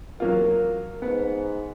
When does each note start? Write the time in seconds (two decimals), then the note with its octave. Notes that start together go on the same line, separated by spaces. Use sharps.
0.20 F#3 A#3 F4 A#4
1.02 G#2 B3